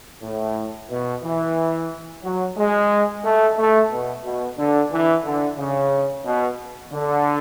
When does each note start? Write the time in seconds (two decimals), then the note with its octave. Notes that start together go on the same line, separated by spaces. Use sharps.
0.22 A2
0.90 B2
1.23 E3
2.24 F#3
2.57 G#3
3.24 A3
3.57 A3
3.90 B2
4.24 B2
4.57 D3
4.91 E3
5.24 D3
5.58 C#3
6.25 B2
6.91 D3